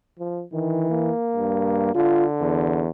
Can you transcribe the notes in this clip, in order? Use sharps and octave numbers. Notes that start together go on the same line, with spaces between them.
F3
D#3 E3
A#3
G2
D3 F4
E2